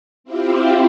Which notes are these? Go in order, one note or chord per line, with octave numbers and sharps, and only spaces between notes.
C4 E4 F4 G4